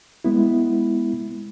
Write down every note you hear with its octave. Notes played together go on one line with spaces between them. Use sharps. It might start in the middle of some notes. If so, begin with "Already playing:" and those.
G#3 B3 E4